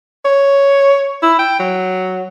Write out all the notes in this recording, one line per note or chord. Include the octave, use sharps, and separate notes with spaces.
C#5
E4
G5
F#3